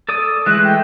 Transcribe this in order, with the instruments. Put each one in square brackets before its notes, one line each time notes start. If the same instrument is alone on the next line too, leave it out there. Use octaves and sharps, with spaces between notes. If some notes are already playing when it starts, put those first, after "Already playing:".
[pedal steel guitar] A4 D5 D#6
[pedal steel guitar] E3 G#3 A3 [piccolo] F#6
[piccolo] G5